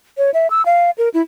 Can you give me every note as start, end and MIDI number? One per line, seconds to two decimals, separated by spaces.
0.18 0.31 73
0.34 0.47 76
0.50 0.65 88
0.66 0.91 77
0.98 1.09 70
1.14 1.22 64